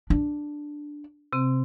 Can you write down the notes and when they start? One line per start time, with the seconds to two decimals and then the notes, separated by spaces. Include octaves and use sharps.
0.10 D4
1.33 C3 C4